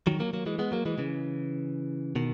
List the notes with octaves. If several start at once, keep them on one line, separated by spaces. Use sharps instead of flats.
D#3 F#3
F#3 A#3
F#3 A#3
E3 G#3
G#3 B3
F#3 A#3
E3 G#3
C#3 E3
B2 D#3